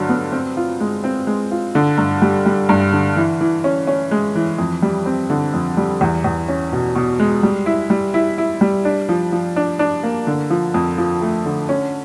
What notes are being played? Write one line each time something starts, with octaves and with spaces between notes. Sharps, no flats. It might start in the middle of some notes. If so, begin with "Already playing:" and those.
Already playing: G2 D3 F#3
B3
C4
F4
G#3
C4
G#3
F4
D3
G2
G3
G3
G2
D3
E3
E3
C#4
C#4
G#3
E3
F2
G3
C4
D3
F2
G3
E2
E2
C#4
B2
B2
G#3
G3
E4
G3
E4
E4
G3
D4
F3
F3
D4
D4
A#3
D3
F3
F2
F3
A3
D3
C#4